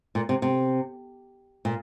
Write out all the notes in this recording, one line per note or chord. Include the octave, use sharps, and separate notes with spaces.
A#2
C3
C3
A#2